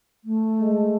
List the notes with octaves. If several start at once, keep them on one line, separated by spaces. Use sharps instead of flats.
A3
G#3